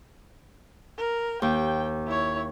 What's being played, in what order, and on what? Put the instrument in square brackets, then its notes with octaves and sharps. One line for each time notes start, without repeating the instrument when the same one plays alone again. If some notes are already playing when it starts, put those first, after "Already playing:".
[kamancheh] A#4
[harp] D#2 [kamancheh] G5
[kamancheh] E4 C#5